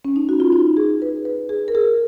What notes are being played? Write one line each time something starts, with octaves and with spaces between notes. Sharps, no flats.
C#4
D#4
F#4
F4
D#4
G#4
B4
B4
G#4
A#4
G#4